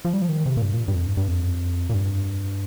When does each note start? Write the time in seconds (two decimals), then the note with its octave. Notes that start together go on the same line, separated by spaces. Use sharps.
0.05 F3
0.13 G3
0.22 F3
0.29 D#3
0.46 C3
0.57 A#2
0.62 G2
0.74 A#2
0.88 G2
0.95 F2
1.06 G2
1.17 G2
1.28 F2
1.89 A#2
1.94 G2